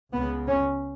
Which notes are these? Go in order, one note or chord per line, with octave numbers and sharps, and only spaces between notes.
C#2 C#3 B3
C#4